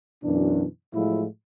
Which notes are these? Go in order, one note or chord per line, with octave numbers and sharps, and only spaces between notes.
F#2 B2 E3 D4
A2 F3 F#3 G#3 E4 F4